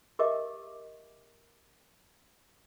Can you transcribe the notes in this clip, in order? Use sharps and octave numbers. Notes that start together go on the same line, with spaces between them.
G4 A#4 D#5 E5 D6